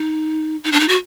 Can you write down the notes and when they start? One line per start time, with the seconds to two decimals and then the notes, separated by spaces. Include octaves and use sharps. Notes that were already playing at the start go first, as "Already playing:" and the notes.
Already playing: D#4
0.64 D#4
0.72 D4
0.80 D#4
0.89 F#4